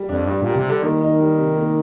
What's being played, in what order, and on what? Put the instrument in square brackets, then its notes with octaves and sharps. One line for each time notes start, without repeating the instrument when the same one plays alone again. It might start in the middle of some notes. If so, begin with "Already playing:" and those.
Already playing: [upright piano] G3 G4
[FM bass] F2 [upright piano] D4
[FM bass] G2 [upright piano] G3
[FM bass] A#2
[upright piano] G4
[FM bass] C3
[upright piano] G3
[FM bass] D3
[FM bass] D#3 [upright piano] A#3
[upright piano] D#4
G3
C3
A#3